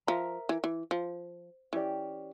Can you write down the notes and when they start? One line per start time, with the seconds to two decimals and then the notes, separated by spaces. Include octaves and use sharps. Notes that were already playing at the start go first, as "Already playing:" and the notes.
0.07 F3 A#4 E5 A#5
0.49 E3
0.64 E3
0.91 F3
1.73 E3 C#4 G4 D5